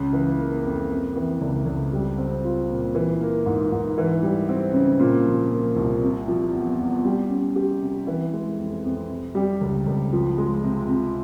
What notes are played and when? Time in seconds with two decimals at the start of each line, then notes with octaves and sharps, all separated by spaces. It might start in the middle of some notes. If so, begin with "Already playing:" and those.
Already playing: C#2 C#3
0.13 E3
0.38 A#3
0.64 F2
0.90 C3
1.15 E3
1.41 C#2
1.66 C#2
1.93 G3
2.18 C4
2.44 F4
2.69 A#2
2.95 E3
3.20 A#3
3.46 G#2
3.72 G#2
3.98 E3
4.23 G3
4.49 C4
4.74 C#3
5.00 A#2
5.26 F3
5.51 A#3
5.76 C2
6.02 C3
6.28 F3
6.53 E2
6.79 E2
7.05 G3
7.30 C#4
7.56 G4
7.82 C3
8.07 E3
8.33 G#3
8.58 F2
8.84 F2
9.10 C3
9.35 G3
9.61 C#2
9.86 C#2
10.13 F3
10.38 G#3
10.64 C3
10.89 C3